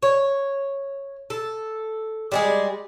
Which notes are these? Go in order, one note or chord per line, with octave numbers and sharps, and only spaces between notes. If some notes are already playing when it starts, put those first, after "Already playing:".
C#5
A4
G3 G#3 G#4